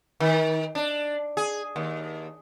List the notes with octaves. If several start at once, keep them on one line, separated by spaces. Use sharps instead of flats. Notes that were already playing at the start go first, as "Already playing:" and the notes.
D#3
D4
G#4
D#2